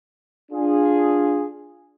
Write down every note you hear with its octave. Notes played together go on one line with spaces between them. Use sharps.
D4 F4 G#4